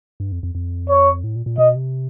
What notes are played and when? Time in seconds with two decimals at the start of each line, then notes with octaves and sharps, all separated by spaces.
0.20 G2
0.32 F2
0.43 F2
0.55 F2
0.89 C#5
1.24 A2
1.35 A#2
1.46 A#2
1.58 B2 D#5
1.75 C3